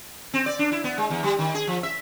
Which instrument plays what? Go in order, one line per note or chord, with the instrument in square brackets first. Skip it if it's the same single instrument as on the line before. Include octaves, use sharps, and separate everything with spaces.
[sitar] C4
D5
D4
E4
B3
G#3
E2
G3
D#3
G#4
F3
E5